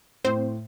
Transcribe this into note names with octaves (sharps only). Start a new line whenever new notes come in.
A2 C4 C5